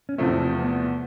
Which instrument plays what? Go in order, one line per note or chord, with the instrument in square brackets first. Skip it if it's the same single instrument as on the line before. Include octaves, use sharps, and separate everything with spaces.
[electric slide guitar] C#4
[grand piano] E2 C3 F3 A3 [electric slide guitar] C4
[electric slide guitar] B3